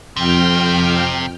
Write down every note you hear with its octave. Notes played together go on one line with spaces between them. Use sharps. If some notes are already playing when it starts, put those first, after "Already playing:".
F2 C3 G5 F6